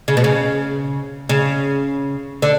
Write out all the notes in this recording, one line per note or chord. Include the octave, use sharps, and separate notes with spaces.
C#3
B2
C#3
C#3
D3